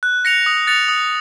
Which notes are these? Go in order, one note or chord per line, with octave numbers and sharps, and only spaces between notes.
F#6
A#6 C#7 F7
D#6
F#6 A6 C#7 F7
D#6